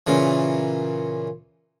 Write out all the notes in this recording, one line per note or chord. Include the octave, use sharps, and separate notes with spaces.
A#2 C#3 E3